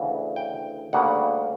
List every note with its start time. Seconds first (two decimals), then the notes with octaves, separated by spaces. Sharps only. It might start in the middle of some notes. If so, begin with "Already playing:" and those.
Already playing: D2 C#3 E3
0.36 G5
0.93 D2 C#3 G3 A#3 F#5